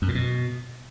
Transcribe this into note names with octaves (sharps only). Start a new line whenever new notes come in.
F#2
A#2
B2